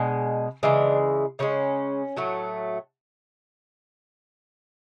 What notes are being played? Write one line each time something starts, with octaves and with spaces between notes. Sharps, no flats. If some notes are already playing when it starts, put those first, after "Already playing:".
Already playing: B2 G#3 D4
C#3 E3 G#3 D4
C#3 E3 G#3 C#4
A2 F#3 A3